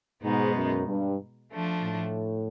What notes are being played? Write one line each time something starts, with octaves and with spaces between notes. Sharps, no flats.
G#2 B2 G#3 B3 D#4
F#2
G2
F3 A3 D4
A2